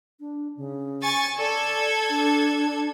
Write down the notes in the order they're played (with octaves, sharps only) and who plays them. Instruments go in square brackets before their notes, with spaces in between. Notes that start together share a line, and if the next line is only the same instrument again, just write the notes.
[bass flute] D4
C#3
[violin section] G#5 C#6 A6
[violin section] A4 G#6 [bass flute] D5
[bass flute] D4